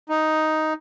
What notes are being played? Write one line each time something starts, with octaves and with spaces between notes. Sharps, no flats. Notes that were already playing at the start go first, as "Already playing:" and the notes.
D#4